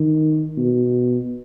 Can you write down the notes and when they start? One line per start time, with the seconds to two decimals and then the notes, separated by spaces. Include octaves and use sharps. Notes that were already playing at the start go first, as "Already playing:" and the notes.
Already playing: D#3
0.58 B2